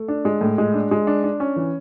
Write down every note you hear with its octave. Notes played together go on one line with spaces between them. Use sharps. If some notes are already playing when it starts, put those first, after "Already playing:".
Already playing: A3
D4
G#3
A2
G#3
D4
G#3
D4
D4
C#4
E3